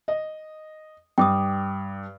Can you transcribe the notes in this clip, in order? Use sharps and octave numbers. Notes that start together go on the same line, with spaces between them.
D#5
G2 G5 D6 D#6